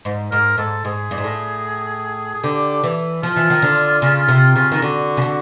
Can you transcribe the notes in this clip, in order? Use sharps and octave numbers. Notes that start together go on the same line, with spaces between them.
G#2
G#2 A#4
G#2 A4
G#2 G#4
G2
G#2
A2
G#4
D3 G4
E3
F3 F4
E3
D#3
D3
C#3
C3
C#3
D#3 F4
D3 F#4
C#3
D3